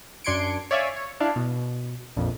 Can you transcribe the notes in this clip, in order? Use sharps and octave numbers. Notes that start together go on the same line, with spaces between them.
F#2 D4 C6 G#6 C#7 D7
C#5 D5 E5 F5 G#5
C#5
D4 E4 F5
B2
A#1 F2